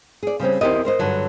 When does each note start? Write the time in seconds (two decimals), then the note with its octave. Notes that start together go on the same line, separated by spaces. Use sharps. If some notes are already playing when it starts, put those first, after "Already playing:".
0.23 G#4 D5
0.40 C#3 G3 C4 C#4
0.61 E2 C4 E4 G4 A#4 D#5
0.85 A#4 C5 D#5
0.99 G2 D3 F#3